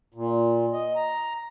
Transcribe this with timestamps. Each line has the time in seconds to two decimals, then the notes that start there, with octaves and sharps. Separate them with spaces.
0.14 A#2
0.73 D#5
0.95 A#5